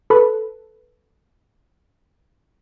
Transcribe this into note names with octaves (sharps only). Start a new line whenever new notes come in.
A4 B4